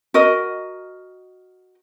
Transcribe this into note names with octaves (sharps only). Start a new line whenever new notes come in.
F#4 A#4 D#5